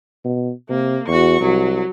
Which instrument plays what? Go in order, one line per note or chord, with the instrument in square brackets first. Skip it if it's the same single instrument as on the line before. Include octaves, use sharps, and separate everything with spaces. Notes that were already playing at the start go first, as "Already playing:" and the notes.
[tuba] B2
[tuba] C3 [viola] A#3
[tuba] E2 [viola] F#4 C#6
[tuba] C2 [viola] F#3